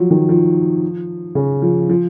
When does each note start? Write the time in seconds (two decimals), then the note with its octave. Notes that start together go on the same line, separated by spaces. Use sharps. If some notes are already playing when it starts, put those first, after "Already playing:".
Already playing: F3 F#3
0.11 D#3
0.29 F3
1.35 C#3
1.62 F3
1.89 F3